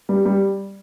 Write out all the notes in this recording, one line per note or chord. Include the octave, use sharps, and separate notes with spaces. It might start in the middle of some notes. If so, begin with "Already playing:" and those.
G3
G3